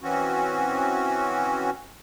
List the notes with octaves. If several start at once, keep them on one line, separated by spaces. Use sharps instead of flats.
E3 C4 C#4 F#4